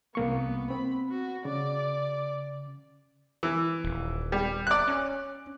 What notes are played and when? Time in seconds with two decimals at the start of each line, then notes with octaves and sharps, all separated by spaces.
0.15 C2 A#3 B3 C#6
0.70 C4 B5
1.10 F#4
1.45 C#3 D5
3.43 E3
3.84 D#1
4.32 G3
4.67 D5 F#6
4.88 C#4